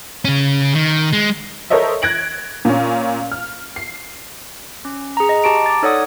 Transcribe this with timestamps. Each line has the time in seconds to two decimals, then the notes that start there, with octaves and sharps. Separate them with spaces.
0.25 C#3 C#4
0.74 D#3
1.13 G#3
1.70 A4 A#4 C5 C#5 D#5 E5
2.02 F#6 G#6 A#6 D7 F#7
2.65 A#2 C#4
3.32 F6
3.76 C7
4.85 C#4
5.17 G#4 A#5
5.29 D#5
5.44 G4 A5 A#5 C#6 D7
5.66 D6 A6
5.83 D#4 A4 C#5 D5 F#5 D#6